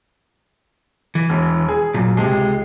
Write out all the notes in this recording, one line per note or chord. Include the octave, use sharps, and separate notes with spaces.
E3
E1
G#4
F#2 A#2
C#2 C3 G#3